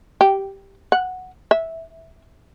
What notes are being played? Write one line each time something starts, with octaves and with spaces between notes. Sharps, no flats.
G4
F#5
E5